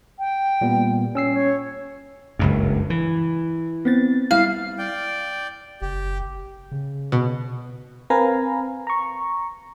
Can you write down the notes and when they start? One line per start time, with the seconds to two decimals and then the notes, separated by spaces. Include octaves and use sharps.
0.19 G5
0.61 A#2 G3 B3
1.15 C#4 E6 C7
1.33 C#5
2.39 F#1 C#2 G2
2.90 E3
3.85 B3 C4 A6
4.31 G3 E4 F5
4.78 D5 G5
5.82 F#1 G4
6.71 C#3
7.12 B2
8.10 C4 A#4 B4 F5 G#5 A#5
8.87 A#5 C#6